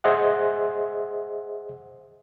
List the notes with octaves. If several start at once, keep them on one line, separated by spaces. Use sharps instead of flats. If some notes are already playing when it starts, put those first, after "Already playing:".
G#4 C5 D#5 E5 F#5